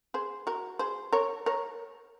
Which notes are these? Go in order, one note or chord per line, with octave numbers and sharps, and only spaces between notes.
G#4 C5
F#4 A#4
G#4 C5
A#4 C#5
A#4 C#5